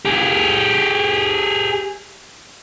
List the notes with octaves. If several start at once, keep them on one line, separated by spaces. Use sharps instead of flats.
G4 G#4